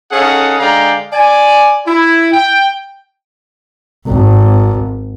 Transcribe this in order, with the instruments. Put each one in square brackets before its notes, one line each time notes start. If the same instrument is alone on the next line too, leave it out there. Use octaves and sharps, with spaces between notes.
[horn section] C#4 D#4 G#4 A4 F5 F#5
D3 G#3 D5 F5 G5 A#5
D5 G#5
E4
G5
[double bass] G#1 G#2